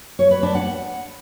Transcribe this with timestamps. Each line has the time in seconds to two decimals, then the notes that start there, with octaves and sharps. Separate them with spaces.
0.19 C#5
0.31 B4
0.43 D4
0.55 F#5